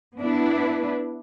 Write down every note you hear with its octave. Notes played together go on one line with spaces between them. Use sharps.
B3 D4 E4 B4